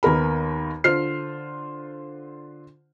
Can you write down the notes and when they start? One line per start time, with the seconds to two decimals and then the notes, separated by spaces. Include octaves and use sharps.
0.03 D#2 B3 A#4 B5
0.84 D3 F4 C5 F6 C7